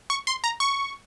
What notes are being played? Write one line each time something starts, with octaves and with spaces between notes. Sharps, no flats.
C#6
C6
A#5
C#6